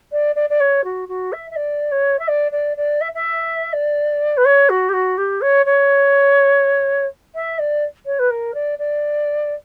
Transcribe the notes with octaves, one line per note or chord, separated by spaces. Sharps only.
D5
D5
D5
C#5
F#4
F#4
E5
E5
D5
C#5
E5
D5
D5
D5
E5
E5
D5
B4
C#5
F#4
G4
F#4
G4
C#5
C#5
E5
D5
C#5
B4
A#4
D5
D5